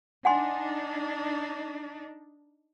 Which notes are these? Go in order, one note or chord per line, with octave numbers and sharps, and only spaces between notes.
D4 D#4 F#5 G#5 C6